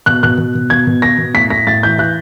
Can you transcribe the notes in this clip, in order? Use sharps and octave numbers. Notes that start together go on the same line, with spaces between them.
B2 F#6
B2 F#6
B2
B2
B2 G#6
B2
B2 A#6
B2
A2 B6
A2 A#6
A2 A6
E3 G6
E3 F#6